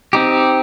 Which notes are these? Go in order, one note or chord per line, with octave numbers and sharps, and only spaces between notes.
C4 D#4 G4